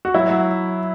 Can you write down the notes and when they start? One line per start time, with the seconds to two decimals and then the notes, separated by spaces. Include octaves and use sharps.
0.05 F#4
0.14 F#3 E4
0.29 F#3